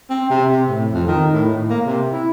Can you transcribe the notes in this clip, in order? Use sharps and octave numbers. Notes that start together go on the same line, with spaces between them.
C4
C3
C3
A2
F2
D#3
A2
A2
A#3
C3
E4